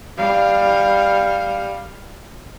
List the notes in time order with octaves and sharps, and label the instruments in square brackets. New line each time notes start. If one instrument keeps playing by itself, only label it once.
[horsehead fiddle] G3 F5